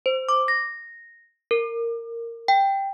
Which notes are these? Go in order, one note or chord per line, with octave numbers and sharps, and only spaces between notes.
C5
D6
A#6
A#4
G5